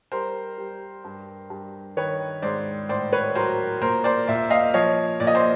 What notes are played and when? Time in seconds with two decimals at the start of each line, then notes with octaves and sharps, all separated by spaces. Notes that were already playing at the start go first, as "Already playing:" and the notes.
0.12 G3 A#4 C5
0.58 G3
1.04 G2
1.50 G2
1.97 D#3 B4 C#5
2.42 G#2 C5 D5
2.89 A2 C5 D5
3.13 B4 C#5
3.35 F#3 A#4 C5
3.81 A#2 A#4 C5
4.04 C5 D5
4.28 A#2 D5 E5
4.50 D#5 F5
4.74 F3 C#5 D#5
5.20 A#2 D5
5.27 D#5
5.35 C5 D5